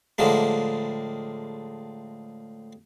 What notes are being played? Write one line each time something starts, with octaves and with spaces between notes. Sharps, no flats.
A2 D3 F3 G#3 A#3